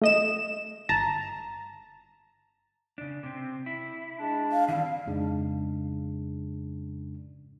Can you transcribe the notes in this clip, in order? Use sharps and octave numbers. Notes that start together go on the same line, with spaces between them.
A3 D#5 E7
G1 A5 A#5
C#3 D4
C3 C4
E4
G#3 D4
F5
D#3 E3 G3 C4 F5
F2 G#2 C#3 G#3 D4